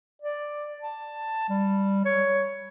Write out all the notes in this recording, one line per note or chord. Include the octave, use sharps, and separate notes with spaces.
D5
A5
G3
C#5